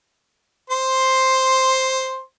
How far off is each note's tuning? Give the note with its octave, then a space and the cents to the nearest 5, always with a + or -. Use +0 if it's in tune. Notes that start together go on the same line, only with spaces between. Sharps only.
C5 +5 C6 +0